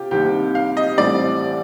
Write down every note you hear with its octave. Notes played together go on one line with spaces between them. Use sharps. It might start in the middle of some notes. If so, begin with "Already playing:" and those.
Already playing: C3 F4 G4
C2 C3 D#3 A#3 G4
F5
D#5
A1 A2 G3 C4 D5